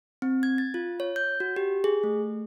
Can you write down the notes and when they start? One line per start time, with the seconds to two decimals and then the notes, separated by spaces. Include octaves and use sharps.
0.22 C4
0.43 G#6
0.58 A6
0.74 F4
1.00 C#5
1.16 G6
1.40 F#4
1.56 G4
1.84 G#4
2.04 A3